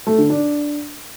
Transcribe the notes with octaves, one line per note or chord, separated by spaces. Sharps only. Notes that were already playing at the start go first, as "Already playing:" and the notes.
A3
D3
D4